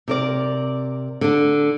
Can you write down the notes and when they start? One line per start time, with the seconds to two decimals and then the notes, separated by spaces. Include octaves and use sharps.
0.08 C3 A#4 D5
1.21 D3 D4